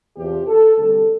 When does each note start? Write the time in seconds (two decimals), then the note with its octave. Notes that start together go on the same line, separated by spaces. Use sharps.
0.17 E2 C3 F3 G4
0.47 A4
0.78 D2 C3 G3 A4